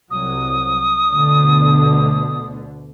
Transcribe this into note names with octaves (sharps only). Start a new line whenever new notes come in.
C2 F#3 D#6
D2 B2 D3